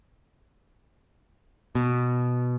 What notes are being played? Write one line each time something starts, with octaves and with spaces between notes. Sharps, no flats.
B2